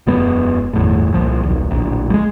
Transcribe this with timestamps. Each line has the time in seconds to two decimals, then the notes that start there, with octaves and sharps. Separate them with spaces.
0.07 E1 F#2 G#3 B3
0.73 G1 E2 A2
1.14 C2 A#2 F3
1.43 D#1 B1
1.71 D1 A#1
2.10 G3 G#3